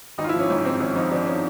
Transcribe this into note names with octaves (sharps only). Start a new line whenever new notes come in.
G#1 D#4
F4
E4
F3
C#4
G#2 C#4
G#2 C4
G#1 C#4
F3 D#4
F3 D4
C#4